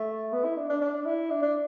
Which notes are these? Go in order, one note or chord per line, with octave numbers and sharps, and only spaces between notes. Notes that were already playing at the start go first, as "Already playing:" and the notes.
Already playing: A3
B3
E4
D4
D4
D4
E4
D4
D4